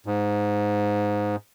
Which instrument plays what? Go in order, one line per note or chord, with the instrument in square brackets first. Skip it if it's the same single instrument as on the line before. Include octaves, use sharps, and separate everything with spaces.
[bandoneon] G#2